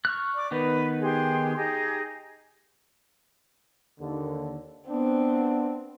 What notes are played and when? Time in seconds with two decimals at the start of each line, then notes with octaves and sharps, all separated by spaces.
0.05 C#6 F6 F#6
0.34 D5 D6
0.51 D#3 B3 D#4 B4
1.01 G4 G#4 C6
1.55 D#4 G4 G#4
4.00 D#2 D3
4.89 B3 C4 D4